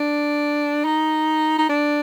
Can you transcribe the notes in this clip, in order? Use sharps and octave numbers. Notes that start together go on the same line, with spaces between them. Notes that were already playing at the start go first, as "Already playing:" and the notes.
Already playing: D4
D#4
D#4
D4